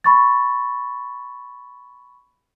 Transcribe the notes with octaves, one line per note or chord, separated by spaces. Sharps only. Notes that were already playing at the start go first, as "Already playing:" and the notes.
B5 C#6 A6